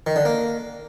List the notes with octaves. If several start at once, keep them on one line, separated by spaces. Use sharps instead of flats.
D#3
D3
A#3